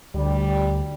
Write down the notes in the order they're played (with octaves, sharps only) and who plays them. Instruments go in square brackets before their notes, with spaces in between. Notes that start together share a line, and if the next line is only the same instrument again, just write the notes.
[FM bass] D2 [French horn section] G3